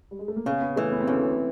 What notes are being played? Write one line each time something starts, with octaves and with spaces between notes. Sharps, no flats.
G3
G#3
A3
A#3
C#3 B3
B3
E3 A3
B3
C4
D2 C#4